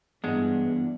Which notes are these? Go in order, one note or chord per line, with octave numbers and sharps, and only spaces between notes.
G2 E3 G#3 B3 D4 F#5